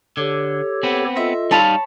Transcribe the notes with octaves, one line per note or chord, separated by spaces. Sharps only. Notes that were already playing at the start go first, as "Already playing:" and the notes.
D3 G4 A4 C#5
B3 C4
F4 A4 D#5 E5
G3 D#4 C#5 F5 A5 B5